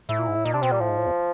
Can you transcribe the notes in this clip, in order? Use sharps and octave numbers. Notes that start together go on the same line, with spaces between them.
A2 E4
A#2
G#2
A2
A#2 D#4
C3 D4
B2 C4
A#2 G3
A2 F3
G#2
A2
E2